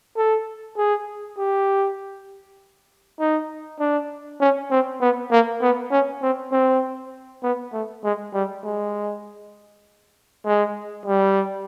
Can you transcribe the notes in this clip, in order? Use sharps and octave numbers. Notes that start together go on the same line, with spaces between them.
A4
G#4
G4
D#4
D4
C#4
C4
B3
A#3
B3
C#4
C4
C4
B3
A3
G#3
G3
G#3
G#3
G3